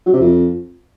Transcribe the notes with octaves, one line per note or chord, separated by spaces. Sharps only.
F#3
C3
F2